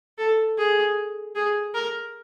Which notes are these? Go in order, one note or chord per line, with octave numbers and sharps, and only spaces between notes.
A4
G#4
G#4
A#4